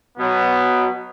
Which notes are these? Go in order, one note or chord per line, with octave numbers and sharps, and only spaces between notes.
B2 F#3 B3